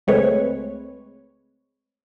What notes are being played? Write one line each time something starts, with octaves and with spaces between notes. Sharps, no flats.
C#2 G#3 A3 C4 B4 C#5